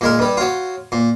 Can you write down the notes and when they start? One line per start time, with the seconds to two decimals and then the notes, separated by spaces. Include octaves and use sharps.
0.01 A#2 G#3 A#4
0.19 G2 G3
0.37 F#3 F4
0.92 A#2